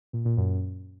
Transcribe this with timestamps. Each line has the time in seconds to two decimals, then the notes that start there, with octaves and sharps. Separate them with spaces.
0.13 A#2
0.25 A#2
0.37 F#2